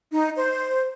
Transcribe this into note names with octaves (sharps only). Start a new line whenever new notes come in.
D#4
C5